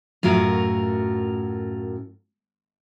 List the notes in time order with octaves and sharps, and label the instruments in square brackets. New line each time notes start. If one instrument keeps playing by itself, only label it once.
[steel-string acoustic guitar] F#2 A2 F4 F#4 A#4